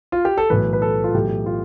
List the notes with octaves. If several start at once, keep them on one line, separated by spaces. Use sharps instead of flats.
F4
G4
A4
B1 A2 E3 B4
B4
A4
F4
B1 A2 E3 G4
F4